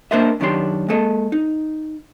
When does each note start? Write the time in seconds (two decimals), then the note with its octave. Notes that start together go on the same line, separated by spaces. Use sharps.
0.11 A#3 D4 A#4 C5 D#5 E5
0.40 F#2 D#3 C#4 D4 G4 C6
0.89 G#3 A#3 A4 D#5
1.32 D#4